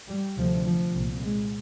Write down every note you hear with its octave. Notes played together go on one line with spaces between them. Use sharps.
G3
D2 C3 F3
F3
C2 A#2
G#3